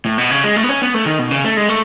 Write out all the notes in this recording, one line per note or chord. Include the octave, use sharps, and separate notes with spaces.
A2
B2
C#3
G#3
A3
B3
C#4
B3
A3
D#3
B2
C#3
A3
G#3
A3